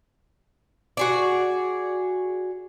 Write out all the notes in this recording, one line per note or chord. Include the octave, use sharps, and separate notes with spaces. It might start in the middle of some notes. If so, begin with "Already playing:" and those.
F#4 G#4 D5